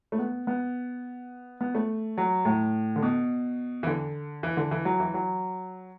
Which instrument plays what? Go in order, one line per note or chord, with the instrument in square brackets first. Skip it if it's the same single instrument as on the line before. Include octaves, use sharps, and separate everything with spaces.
[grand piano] A3
B3
B3
B3
A3
F#3
A2
D3
B2
E3
D3
E3
D3
E3
F#3
E3
F#3